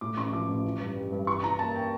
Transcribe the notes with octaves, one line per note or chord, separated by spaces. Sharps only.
A2 D6
A1 C#6
F3 D6
A1
E3
G2
G3
G2
E3 C#6
E4 A#5
A#3 A5
G5